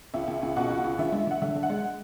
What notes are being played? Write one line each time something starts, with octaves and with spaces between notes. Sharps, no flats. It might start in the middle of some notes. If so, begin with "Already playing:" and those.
C#2 E5
C#2
C#2
B2 F#5
C#2
C#2
D2 E5
G#3
D2 F#5
D3 E5
D3
F#5
G#3